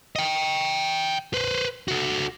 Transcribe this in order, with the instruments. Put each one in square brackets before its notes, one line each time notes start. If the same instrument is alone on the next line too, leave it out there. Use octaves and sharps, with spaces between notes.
[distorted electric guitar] D#5 G5
B4 C5
F#4 A4